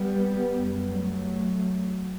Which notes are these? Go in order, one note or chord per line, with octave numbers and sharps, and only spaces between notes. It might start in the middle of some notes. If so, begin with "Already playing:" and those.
Already playing: G3 B3
F#2
F#3 A3